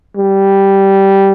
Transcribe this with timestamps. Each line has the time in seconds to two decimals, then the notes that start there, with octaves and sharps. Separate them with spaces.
0.17 G3